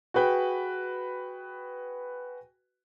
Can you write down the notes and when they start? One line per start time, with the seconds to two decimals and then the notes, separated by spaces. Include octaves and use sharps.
0.14 F#4 G#4 B4 G5